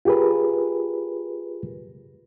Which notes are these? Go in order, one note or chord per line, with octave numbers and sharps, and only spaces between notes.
F4 G4 G#4 A#4 B4